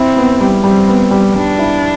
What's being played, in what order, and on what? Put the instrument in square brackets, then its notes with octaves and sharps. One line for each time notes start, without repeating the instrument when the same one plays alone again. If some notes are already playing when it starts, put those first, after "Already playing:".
Already playing: [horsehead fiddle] C4 [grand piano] E4
[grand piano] B3
G3
[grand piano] G3 [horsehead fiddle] C4
[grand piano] B3
G3
[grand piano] G3 [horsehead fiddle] D4
[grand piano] E4